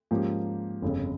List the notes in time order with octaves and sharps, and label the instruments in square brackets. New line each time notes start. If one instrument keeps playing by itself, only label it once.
[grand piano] G#2 F3 A#3 C#4 G4
G1 F2 C#3